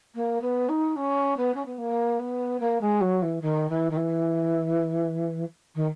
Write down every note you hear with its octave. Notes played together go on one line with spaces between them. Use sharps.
A#3
B3
D#4
C#4
B3
C#4
B3
A#3
B3
A#3
G#3
F#3
E3
D#3
E3
D#3
E3
D#3